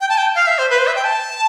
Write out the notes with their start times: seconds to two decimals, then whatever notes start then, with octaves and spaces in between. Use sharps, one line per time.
0.01 G5
0.09 A5
0.18 G5
0.35 F5
0.47 E5
0.58 C5
0.70 B4
0.79 C5
0.87 E5
0.95 G5
1.04 A5